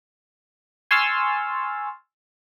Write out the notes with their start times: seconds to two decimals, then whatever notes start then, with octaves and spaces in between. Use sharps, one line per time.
0.91 G#5 C6 C#6 E6 F6 A6